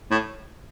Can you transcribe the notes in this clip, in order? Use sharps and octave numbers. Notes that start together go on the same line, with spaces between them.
A2